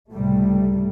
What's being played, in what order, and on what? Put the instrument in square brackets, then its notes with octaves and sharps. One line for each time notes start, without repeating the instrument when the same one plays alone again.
[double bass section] C#2 A2 C3 G3 A3